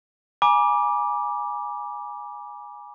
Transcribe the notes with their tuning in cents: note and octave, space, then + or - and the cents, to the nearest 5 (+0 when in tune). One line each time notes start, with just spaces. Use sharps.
G#5 +0 B5 -45 D6 +0